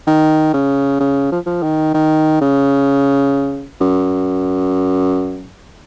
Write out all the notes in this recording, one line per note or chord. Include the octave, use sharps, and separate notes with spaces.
D#3
C#3
C#3
F3
F3
D#3
D#3
C#3
F#2